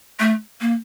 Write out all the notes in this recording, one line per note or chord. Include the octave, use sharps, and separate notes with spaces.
A3
A#3